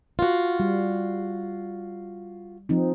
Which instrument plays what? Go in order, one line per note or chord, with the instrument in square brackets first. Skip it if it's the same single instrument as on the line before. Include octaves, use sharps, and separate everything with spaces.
[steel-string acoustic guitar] F4 F#4
[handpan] G3
F3 C4 D#4